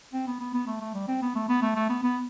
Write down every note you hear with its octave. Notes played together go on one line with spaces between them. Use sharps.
C4
B3
B3
B3
A3
A3
G3
C4
B3
A3
B3
A3
A3
B3
B3